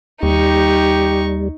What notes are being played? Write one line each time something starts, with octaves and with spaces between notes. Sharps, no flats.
D#2 G3 D#4 G4 C#6